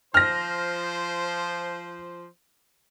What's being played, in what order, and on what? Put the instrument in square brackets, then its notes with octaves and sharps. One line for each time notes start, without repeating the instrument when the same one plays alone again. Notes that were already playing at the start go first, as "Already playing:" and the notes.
[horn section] F3 C5 [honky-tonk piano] F6 A#6